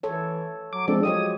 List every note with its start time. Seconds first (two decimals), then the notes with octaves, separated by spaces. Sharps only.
0.03 E3 A4 C#5
0.73 F#3 D6
0.88 F3 G#3 C4 D4 A4
1.03 F#3 G#3 G4 C#5 D#6